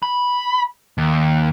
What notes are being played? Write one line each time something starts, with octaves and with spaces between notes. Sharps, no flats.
B5
D#2